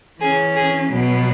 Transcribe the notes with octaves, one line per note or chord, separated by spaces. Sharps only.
E3 C#4 G#4
G#4
B2 F#3 B3